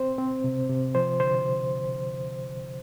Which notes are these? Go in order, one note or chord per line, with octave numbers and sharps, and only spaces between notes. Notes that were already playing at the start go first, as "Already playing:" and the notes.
Already playing: C4 C5
C4
C3
C3
F3 C5
D3 C5